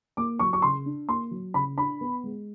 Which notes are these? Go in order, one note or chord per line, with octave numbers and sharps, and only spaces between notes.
A#3 D6
F#3 C#6
C#6
C#3 C6
D4
A#3 C6
F#3
C#3 B5
D4 B5
B3
G#3